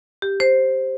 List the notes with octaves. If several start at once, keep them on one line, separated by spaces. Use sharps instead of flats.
G4
C5